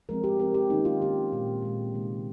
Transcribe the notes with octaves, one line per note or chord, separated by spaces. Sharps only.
F3 G#3 C4 A#4
G4
F3 G#3 C4 A#4
G4
D#3 A#3 C#4 D#4
F4
D#3 A#3 C#4 G4
A#2 G#3 C4
A#2 G#3 C4
C3 D#3 G#3